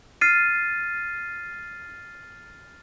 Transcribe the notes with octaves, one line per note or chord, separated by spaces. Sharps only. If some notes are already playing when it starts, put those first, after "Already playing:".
F6 A6 C7 D#7